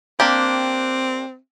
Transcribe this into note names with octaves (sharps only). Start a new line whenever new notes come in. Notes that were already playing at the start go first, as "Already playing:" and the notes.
A#3 C4 D4 G4